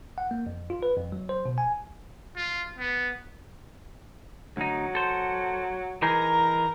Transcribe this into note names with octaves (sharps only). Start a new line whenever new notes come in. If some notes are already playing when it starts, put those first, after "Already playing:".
F#5
A#3
F2
F4
B4
F2
F#3
C5
B2
G#5
F4
B3
D2 F#3 D#4
A4 C5
E3 D#4 G#4 A#4 A#5